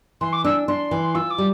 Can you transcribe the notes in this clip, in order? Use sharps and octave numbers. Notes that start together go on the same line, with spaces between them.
E3 C6
D6
D4 E6
D4 C6
E3
F4 E6
D6
G3